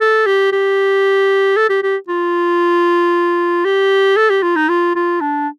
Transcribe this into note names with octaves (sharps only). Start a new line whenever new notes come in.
A4
G4
G4
A4
G4
G4
F4
G4
A4
G4
F4
D#4
F4
F4
D4